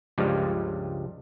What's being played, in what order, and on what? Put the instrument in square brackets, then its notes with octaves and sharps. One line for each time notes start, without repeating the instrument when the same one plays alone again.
[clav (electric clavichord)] C#2 G2 F3 G3 G#3